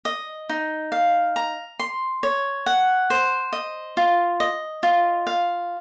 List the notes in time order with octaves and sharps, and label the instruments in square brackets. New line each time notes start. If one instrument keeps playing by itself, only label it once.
[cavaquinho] D#5
D#4
F5
A#5
C6
C#5
F#5
C5
D#5
F4
D#5
F4
F5